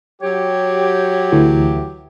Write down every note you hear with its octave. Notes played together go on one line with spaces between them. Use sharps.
F#3 G4 C#5
D2 E3 A3